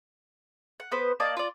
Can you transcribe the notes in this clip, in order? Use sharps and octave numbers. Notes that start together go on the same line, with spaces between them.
F#5
B3 B4 C5
A#3 D5 D#5 A5
F4 D5